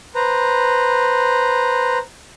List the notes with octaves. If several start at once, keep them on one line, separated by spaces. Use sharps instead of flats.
B4 C5 A#5